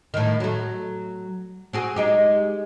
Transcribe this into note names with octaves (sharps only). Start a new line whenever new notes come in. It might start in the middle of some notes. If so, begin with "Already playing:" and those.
A2 D#3
F#3 A3
C4 F#4 G#4
G#3 D#4 G4